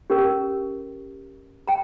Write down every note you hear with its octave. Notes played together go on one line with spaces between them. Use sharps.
C#4 G4 A#4
G5 A#5